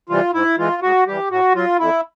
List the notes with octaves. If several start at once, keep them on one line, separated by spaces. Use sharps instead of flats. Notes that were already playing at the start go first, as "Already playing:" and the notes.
C3 E3 G3 F4
G#2 E4
E3 G#3 F4
G#2 F#4
E3 G3 G4
A2 F#4
F#3 F4
F2 E4